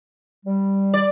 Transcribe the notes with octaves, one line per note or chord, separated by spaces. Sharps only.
G3
D5